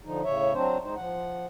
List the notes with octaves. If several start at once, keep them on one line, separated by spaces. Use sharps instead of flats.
D3 F3 D#4
A2 C#3 C#5 E5
F#3 C4 D4 C5
G#3 D#4 C5
F3 F#5